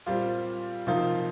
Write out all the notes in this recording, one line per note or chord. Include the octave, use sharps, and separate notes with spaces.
A#2 G3 C4 F4
C3 F3 A#3 D#4 F4